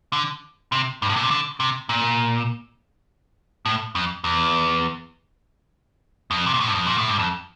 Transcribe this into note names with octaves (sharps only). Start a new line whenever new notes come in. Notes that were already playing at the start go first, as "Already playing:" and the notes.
D3
C3
G2
A2
A#2
C3
D3
C3
A#2
A2
F2
E2
F2
C3
A#2
A2
G2
F2
A#2
A2
G2
F2